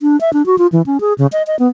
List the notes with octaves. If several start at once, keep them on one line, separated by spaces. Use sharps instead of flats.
D4
E5
D4
F#4
F4
E3
C#4
G#4
C#3
D#5
D#5
B3